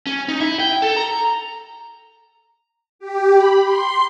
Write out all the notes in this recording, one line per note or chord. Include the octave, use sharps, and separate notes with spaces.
C#4
D#4
E4
G5
A4
A#5
G4
B5
C6